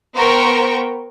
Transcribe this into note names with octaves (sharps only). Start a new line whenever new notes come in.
B3 A#4 C5 G5 A#5 C#6